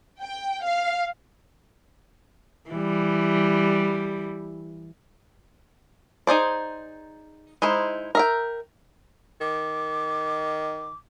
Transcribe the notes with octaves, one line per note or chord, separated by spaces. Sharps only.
G5
F5
E3 G3
D#4 G#4 C5 D5
G#3 D#4 E4 C5
A#4 E5 G5
D#3 D6